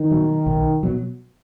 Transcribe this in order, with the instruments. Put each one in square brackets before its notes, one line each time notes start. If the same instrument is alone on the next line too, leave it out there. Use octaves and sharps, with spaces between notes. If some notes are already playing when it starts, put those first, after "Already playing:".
Already playing: [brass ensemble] D#3
[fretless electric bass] B2 F#3
B1
B2 F#3